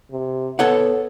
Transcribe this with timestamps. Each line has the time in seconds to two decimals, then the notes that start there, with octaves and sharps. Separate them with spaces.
0.11 C3
0.59 B3 A4 C#5 F#5